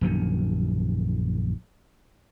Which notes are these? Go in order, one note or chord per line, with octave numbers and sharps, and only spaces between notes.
A#1 F#2 D3 D#3